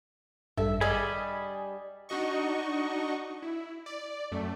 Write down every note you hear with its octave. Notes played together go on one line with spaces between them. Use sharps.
A1 G2 G3 A4 E5
G3 D4 G#4 D#5 G#5 B5 D#6
D4 D#4 F#4 D#5 C#6
E4
D5
F#2 A3